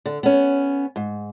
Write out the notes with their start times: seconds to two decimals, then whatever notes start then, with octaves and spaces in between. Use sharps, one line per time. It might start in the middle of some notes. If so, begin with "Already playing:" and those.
0.06 D3
0.23 B3 C#4
0.96 G#2